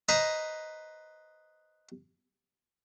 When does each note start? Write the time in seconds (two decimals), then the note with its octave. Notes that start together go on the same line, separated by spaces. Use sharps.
0.09 B4 C5 D#5 A#5